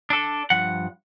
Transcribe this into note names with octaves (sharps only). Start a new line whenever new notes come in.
D4 A4
G2 F3 F#5